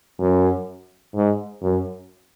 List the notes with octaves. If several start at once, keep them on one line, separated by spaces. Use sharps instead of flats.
F#2
G#2
F#2